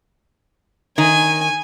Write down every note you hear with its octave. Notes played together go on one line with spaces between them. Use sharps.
D#3 G#5